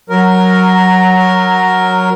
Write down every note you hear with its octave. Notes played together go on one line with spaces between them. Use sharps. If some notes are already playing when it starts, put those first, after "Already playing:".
F#3 A#4